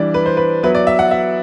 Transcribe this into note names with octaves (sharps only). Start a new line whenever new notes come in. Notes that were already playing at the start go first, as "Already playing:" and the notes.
Already playing: E3 G3 D4 D5
B4
C5
B4
F#3 B3 E4 B4
D5
E5
F#5
E5